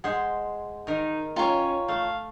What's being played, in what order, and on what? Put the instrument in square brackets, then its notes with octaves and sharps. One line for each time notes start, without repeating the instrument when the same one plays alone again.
[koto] G#3 C5 [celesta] F#5
[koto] D#3 A#4 [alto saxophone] D#4
[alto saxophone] C#4 [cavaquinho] F4 C#5 [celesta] G5 A#5
[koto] A3 [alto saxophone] F5